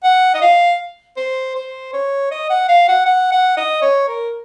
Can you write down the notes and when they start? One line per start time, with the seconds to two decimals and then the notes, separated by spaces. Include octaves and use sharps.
0.03 F#5
0.34 D#5
0.42 F5
1.17 C5
1.55 C5
1.93 C#5
2.31 D#5
2.50 F#5
2.69 F5
2.88 F#5
3.06 F#5
3.32 F#5
3.57 D#5
3.82 C#5
4.08 A#4